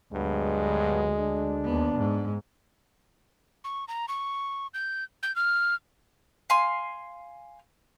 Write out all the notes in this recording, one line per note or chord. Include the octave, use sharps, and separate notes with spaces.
D2 G2 F#3 G#3 B3
D4
D#2 B3
G#2
C#6
A#5
C#6
G6
G6
F6
F5 G#5 C6